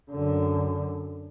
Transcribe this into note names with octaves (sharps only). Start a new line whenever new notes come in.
F#2 D3